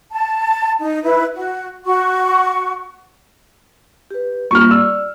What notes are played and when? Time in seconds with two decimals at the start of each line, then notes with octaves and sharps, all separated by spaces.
0.11 A5
0.82 D#4
1.03 E4 B4
1.34 F#4
1.85 F#4 F#5 C#6
4.11 G4 B4
4.51 G3 A#3 F4 C#6 F6
4.71 D5 E6